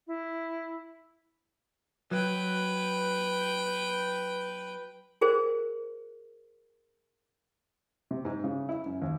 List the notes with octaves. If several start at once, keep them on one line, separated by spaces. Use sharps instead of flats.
E4
F#3 B4 G5
F#4 G#4 A#4 C5
C3
G#2
C#3
E4
F#2
D#2